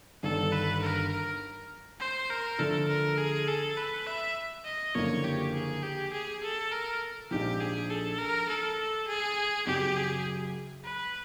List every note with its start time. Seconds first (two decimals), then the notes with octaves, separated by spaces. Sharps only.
0.23 G1 G2 D#3 A4
0.52 B4
0.82 A#4
1.11 A#4
2.00 C5
2.30 A#4
2.59 D3 F3 A3 A4
2.89 A#4
3.18 G#4
3.47 A4
3.77 B4
4.07 E5
4.65 D#5
4.95 F#1 F#2 D3 F3 A#3 C#5
5.24 G4
5.54 G#4
5.83 G4
6.13 G#4
6.43 A4
6.72 A#4
7.31 A#1 G#2 F3 G4
7.61 G#4
7.90 A4
8.19 A#4
8.49 A4
9.07 G#4
9.67 F#2 C#3 F#3 G4
9.97 G#4
10.84 B4